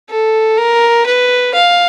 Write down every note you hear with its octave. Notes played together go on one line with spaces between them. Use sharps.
A4
A#4
B4
F5